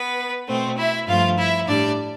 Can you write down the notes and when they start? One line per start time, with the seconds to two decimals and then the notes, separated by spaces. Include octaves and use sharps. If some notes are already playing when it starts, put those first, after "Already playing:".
Already playing: B3 B4
0.47 B2 A3 C4 C5
0.78 E4 E5
1.07 G2 F3 A3 F4 F5
1.38 E4 E5
1.67 A2 G3 D4 D5